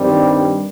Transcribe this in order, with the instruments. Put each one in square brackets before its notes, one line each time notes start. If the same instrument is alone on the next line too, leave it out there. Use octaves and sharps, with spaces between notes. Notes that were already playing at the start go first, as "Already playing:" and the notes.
Already playing: [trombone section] G2 D#3 G3 C4